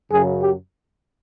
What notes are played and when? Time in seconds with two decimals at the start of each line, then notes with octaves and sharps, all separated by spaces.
0.11 F#2 C#3 F#3 G#4
0.42 G4